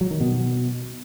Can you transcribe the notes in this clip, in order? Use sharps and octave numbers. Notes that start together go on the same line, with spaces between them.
F#3
D#3
B2